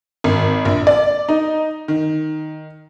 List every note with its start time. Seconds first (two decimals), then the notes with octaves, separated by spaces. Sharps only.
0.24 G#1
0.65 A#1
0.87 D5
1.29 D#4
1.88 D#3